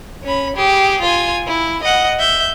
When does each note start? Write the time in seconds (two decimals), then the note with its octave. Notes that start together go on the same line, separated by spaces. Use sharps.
0.23 C#4 B5
0.56 G4 G#4
1.02 F4 G#5
1.47 E4
1.83 D#5 F#5
2.19 E5 G6